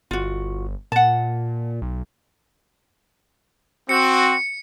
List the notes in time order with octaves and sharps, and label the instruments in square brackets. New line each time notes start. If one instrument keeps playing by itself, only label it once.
[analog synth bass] G1 [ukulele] F4 F#4
[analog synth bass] A#2 [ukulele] F#5 A5
[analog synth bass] B1
[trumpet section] C4 F#4 [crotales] C#7